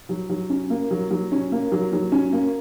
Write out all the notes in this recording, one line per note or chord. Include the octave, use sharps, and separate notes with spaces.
F#3
F#3
C#4
A#3
F#3
F#3
C#4
A#3
F#3
F#3
C#4
A#3